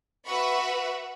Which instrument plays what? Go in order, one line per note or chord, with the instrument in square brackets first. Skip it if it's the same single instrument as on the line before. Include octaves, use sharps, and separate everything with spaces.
[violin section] F#4 B4 E5 F#5 B5 C#6